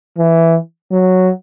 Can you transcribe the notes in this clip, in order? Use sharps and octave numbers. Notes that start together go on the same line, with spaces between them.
E3
F#3